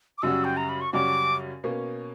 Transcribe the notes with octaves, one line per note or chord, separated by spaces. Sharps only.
D6
F#2 C#3 G3 C#4 F#4 E6
G5
A#5
B5
C#6
F#2 C#3 G3 C#4 F#4 D6
B2 A#3 C#4